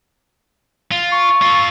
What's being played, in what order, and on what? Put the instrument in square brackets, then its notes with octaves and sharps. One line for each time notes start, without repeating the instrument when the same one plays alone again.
[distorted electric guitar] F4
[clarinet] C#6
[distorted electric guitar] F4 A4